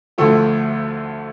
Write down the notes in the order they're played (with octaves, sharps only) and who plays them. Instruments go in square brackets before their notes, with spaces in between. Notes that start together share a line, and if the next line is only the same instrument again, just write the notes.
[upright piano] D2 D3 F3 A3